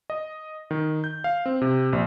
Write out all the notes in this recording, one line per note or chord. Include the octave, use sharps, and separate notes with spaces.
D#5
D#3
G6
F5
C4
C3
A#1